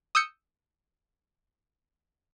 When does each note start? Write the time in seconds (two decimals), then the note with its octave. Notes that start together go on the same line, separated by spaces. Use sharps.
0.15 D#6 E6 G6 C#7